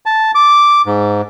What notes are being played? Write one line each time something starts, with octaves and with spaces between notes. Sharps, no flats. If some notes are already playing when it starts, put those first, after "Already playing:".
A5
D6
G#2